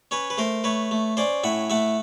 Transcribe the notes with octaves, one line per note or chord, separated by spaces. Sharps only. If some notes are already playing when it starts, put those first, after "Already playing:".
C#4 B4 C#5
B4
A3 A#4 C5
A3 B4 C#5
A3
C#4 C5 D5
A2 E5 F#5
A3 E5 F#5